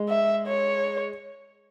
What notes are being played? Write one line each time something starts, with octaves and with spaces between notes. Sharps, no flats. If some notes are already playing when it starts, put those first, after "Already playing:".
Already playing: G#3
E5
C#5